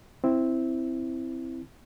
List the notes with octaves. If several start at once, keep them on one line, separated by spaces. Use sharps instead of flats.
C4 E4